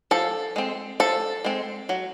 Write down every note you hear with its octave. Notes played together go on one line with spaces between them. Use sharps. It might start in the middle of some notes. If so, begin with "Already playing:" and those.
F3 A4
G#3 C4
F3 A4
G#3 C4
F#3